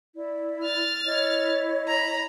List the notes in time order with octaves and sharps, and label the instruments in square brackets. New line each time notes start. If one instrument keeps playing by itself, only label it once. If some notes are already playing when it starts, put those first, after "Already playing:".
[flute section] E4 D5
[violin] F6 A6
[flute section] E4 C#5 D#5
[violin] A#5 B5